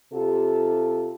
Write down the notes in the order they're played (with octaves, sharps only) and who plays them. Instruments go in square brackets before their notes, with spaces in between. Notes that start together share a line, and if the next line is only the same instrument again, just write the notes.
[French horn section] C3 F4 G4 A4